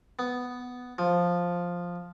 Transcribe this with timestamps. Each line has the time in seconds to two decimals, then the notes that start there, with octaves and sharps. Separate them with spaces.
0.19 B3
0.98 F3